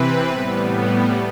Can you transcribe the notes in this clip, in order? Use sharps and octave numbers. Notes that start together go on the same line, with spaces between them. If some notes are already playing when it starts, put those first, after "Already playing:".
Already playing: C3 E3 C4 B4
A2 G3 B3